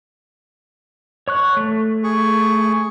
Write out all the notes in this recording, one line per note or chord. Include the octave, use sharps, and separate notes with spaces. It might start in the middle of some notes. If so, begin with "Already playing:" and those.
C#5 C#6 F#6
A3
G#4 C#6